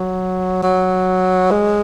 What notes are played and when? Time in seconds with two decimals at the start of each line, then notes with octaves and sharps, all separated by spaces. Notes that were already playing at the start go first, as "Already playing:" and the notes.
Already playing: F#3
0.63 F#3
1.51 G#3